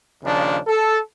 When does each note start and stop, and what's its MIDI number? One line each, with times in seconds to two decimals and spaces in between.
0.24 0.58 39
0.24 0.58 49
0.24 0.58 53
0.24 0.58 62
0.67 0.97 69